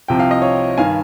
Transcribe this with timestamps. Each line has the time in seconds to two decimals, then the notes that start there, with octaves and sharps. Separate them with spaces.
0.08 C2 C3 F3 G5
0.19 F5
0.31 D#5
0.42 C#5 F5
0.78 G2 D#3 F5 G#5